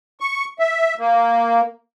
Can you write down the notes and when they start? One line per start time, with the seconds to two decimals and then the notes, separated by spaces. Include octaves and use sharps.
0.20 C#6
0.59 E5
0.98 A#3